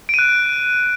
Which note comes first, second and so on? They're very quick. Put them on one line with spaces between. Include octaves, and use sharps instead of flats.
D7 D#7 F#6